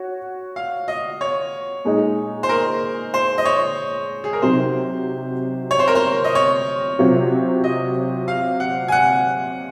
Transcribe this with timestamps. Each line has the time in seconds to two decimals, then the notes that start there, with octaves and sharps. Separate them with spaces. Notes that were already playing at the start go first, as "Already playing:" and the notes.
Already playing: F#4 C#5
0.56 F5
0.88 D#5
1.21 C#5
1.85 A#2 G#3 D#4 G#4 D#5
2.43 C5
2.49 A#4
3.14 C5
3.38 D#5
3.45 C#5
4.24 G#4
4.33 A#4
4.42 C3 F#3 C4 D#4 C5
5.71 C#5
5.79 C5
5.87 A#4
5.95 C5
6.24 D#5
6.35 C#5
6.99 C3 F#3 C4 F4
7.64 D#5
8.28 F5
8.60 F#5
8.88 G#5
8.92 F#5